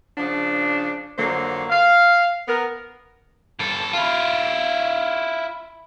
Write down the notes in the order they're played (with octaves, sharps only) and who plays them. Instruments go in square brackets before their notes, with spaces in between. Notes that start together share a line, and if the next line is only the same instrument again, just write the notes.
[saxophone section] C#3 F3 D4
F2 D3 F#3 A#3 C5
F5
B3 A#4
[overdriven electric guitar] G2 A4
E4 F4